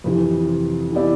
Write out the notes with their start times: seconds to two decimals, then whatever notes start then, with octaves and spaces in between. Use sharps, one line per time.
0.04 F2 C3 E3
0.92 E3 B3 E4 G4 D5